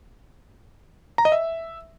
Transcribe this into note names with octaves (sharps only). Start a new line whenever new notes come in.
A#5
D#5
E5